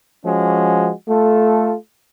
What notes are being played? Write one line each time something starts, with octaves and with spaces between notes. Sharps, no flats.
F3 G#3 C#4 F#4
A3 F4 A4